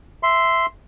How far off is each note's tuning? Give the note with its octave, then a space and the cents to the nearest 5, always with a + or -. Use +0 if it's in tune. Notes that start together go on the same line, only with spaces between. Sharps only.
E5 +5 C6 -10